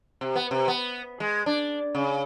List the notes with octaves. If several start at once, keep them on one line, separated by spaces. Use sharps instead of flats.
C3
B3
C3
B3
G#3
D4
C#3